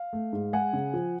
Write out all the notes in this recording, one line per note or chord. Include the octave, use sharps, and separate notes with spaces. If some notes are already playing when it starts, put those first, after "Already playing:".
Already playing: F5
A3
G#2
G#3 F#5 G#5
C#3
F3